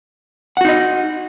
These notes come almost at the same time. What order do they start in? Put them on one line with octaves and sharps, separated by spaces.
F#5 F#4 D#4 D#5